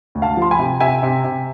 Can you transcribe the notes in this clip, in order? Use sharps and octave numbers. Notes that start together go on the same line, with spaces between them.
D2
F5 A5
F3 C6
G#5 B5
C3
C3 E5 G#5
C3
C3